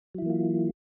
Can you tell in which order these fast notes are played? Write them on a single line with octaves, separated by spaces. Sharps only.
F#3 E4 E3 A#3 F4